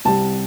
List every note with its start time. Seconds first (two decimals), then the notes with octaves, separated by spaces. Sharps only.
0.05 C2 C3 G3 A5